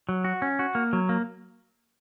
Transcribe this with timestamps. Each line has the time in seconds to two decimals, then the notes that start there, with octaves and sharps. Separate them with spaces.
0.09 F#3
0.24 F#4
0.42 C#4
0.59 F#4
0.75 A#3
0.93 F#3
1.09 A#3